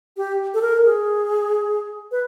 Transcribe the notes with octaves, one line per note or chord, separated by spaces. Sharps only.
G4
A4
A#4
G#4
B4